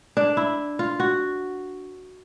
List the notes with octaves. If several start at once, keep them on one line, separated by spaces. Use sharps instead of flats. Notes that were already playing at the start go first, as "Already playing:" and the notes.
D4
E4
F4
F#4